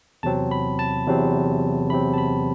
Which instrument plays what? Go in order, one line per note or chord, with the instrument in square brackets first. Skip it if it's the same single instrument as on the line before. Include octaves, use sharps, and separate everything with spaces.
[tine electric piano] E2 C3 F#3 C4 A5
B5
A5
E2 C3 F#3 C4
E2 C3 F#3 C4 B5
A5
B5